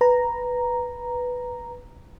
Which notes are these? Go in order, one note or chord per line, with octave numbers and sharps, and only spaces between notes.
B4 A#5